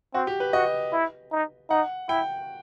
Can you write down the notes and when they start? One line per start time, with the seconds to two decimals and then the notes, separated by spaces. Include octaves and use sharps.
0.14 C4 F#4
0.27 G4
0.40 B4
0.52 F#4 D#5
0.93 E4
1.31 D#4
1.70 D#4 F#5
2.09 E4 G5